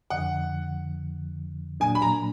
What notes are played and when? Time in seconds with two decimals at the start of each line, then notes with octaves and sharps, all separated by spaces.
0.10 F2 D3 F3 F#5
1.80 A#2 F#3 A#3 D4 G#5
1.95 B5
2.02 A#5